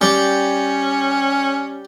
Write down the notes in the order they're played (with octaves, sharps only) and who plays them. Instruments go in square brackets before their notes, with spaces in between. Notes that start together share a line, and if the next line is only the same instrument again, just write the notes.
[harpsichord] G3 [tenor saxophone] C#4